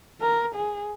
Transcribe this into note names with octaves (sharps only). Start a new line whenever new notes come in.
A#4
G#4